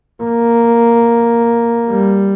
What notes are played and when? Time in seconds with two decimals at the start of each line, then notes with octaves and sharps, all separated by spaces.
0.23 A#3
1.90 G3